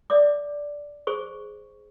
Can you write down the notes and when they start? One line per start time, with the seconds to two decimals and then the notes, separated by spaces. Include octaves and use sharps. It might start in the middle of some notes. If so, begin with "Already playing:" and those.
0.10 D5 E5 D6
1.07 G#4 C5 C#6